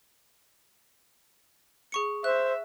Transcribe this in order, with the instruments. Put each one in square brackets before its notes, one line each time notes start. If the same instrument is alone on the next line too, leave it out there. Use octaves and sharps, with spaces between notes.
[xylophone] G#4 C#6 C#7
[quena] C5 [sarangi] E5 [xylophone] F#6